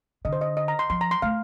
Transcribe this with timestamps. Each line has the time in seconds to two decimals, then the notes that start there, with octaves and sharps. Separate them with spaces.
0.25 D3 D#5
0.33 C5
0.41 D#5
0.57 D#5
0.68 A#5
0.79 C6
0.90 F3 C6
1.01 A#5
1.11 C6
1.22 A3 F5